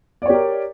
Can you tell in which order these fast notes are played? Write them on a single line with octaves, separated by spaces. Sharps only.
D5 C#5 G4 A#4